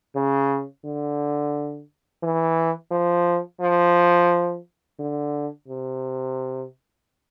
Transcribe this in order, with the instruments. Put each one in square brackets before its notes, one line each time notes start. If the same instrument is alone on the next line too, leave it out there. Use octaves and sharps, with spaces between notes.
[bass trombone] C#3
D3
E3
F3
F3
D3
C3